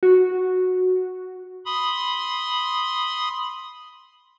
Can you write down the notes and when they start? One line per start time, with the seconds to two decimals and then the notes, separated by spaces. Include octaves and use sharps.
0.03 F#4
1.65 B5 C6 D#6